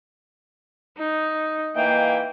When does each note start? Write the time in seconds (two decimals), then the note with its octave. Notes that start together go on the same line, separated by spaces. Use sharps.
0.97 D#4
1.76 D#3 E3 A#3 G5